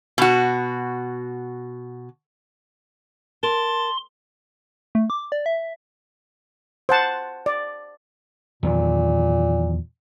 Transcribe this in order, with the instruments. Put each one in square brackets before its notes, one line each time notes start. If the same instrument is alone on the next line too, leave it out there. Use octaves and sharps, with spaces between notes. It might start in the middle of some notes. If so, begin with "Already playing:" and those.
[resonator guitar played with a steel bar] B2 F#4
[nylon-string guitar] A#4 [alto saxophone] A5 [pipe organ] C6
[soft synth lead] A3
D6
D5
E5
[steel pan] C5 F#5 A5
D5
[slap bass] E2 D#3 F#3 [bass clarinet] A#2